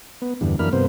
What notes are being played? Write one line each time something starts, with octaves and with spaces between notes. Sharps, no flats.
B3
E2 G2 D3
F#2 E3 A#3 D4 B5 F6
G2 C3 A#3 B3 C5